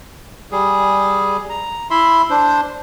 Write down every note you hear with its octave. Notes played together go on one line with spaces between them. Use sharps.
G3 G#4
A#5
E4 E5 B5 C6
D4 C5